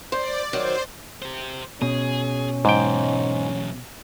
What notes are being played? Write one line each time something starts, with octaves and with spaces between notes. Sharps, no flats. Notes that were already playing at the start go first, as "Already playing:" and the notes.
C5 D5
D#3 F#3 C5
G4 C5
B2 C#4 G#4
B1 E2 G#2 G5